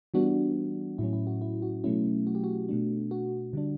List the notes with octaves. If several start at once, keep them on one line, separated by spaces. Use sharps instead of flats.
E3 G3 B3 D4 F#4
A2 F#3 C#4 E4
E4
F#4
E4
F#4
B2 F#3 A3 C#4 E4
F#4
G4
F#4
B2 A3 D4
F#4
D3 G3 D4